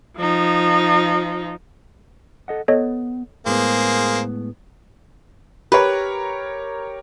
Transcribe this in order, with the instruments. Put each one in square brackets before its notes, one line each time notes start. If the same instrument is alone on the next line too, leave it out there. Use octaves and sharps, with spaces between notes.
[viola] F3 D#4
[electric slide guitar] A4 D#5 F#5
[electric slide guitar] B3 [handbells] A4 C#5 D#5
[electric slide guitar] A2 G#3 B3 [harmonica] A#3 G#4 C5
[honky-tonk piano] G4 A#4 C#5 [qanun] B4